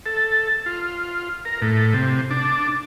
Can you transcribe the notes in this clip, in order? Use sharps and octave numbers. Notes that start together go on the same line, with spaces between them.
A4
F4
A#4
A2
C3
D4